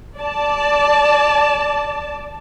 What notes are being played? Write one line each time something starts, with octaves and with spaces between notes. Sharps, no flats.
D5 A5